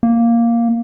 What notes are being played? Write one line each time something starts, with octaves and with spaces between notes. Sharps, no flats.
A#3